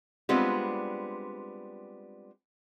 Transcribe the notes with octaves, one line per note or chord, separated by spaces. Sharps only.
G3 G#3 B3 C4 D4 F4